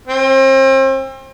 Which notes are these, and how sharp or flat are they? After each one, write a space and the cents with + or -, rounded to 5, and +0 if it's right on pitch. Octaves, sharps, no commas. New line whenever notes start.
C4 +35